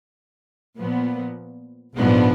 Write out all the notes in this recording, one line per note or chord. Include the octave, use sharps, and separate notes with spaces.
A#2 F3 B3
A#1 G#2 F3 B3 D4